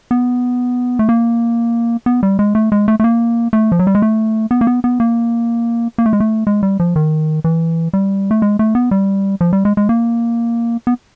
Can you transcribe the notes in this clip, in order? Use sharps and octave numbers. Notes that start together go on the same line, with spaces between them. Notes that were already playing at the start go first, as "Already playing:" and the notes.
B3
A3
A#3
B3
G3
G#3
A3
G#3
A3
A3
A#3
A3
F3
F#3
G3
G#3
A3
B3
A#3
B3
B3
A#3
A#3
A3
G#3
A3
G#3
G3
F3
D#3
E3
G3
A3
G#3
A3
B3
G3
F3
G3
G#3
G#3
A#3
B3